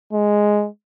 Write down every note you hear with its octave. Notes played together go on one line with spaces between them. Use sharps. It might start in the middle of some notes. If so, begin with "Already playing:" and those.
G#3